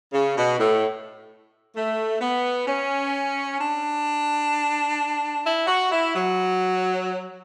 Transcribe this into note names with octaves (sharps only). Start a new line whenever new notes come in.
C#3
B2
A2
A3
B3
C#4
D4
E4
F#4
E4
F#3